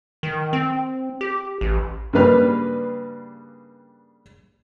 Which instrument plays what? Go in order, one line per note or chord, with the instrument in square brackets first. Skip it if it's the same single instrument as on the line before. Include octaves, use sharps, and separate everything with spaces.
[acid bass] D#3
C4
G4
A1
[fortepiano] G2 C#3 G3 A#3 B4 F6